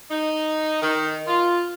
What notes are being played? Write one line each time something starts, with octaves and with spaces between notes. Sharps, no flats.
D#4
D#3
F4